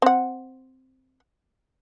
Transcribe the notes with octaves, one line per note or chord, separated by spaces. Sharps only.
C4 F#5